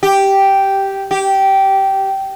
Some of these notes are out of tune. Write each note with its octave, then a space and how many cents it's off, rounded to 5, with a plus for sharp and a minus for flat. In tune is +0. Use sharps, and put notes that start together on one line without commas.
G4 -5
G4 -15